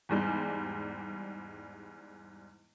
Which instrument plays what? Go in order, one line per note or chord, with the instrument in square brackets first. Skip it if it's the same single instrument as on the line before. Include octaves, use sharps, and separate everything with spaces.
[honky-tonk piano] E2 G#2 G3 G#3